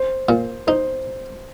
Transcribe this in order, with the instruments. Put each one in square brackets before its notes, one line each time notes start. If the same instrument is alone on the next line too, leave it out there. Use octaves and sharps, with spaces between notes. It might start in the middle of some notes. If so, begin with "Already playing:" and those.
Already playing: [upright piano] C5
[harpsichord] A#2
[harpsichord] D#4 [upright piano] C5